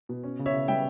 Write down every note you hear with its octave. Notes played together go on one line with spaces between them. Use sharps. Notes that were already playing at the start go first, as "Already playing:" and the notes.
B2
C#4
C#3
C#5 E5
C#3
G3 E5 G5